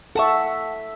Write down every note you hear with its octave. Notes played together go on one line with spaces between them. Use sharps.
A4 E5 F#5 A5 C#6